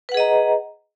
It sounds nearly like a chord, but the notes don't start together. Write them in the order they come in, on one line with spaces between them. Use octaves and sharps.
B4 F#5 G#4 D#5 A#5